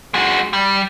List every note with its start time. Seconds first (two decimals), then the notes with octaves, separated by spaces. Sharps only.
0.14 G#3 F#4
0.53 G3